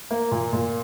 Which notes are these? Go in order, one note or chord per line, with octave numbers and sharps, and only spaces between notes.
A#3
A#2
A#2